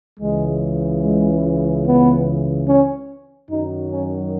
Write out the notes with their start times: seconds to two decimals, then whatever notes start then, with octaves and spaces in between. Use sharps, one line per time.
0.19 C#2 C#3 E3 G#3
1.02 G#3
1.86 B3
2.68 C#4
3.50 F#2 D#3 F#3 D#4
3.91 C#4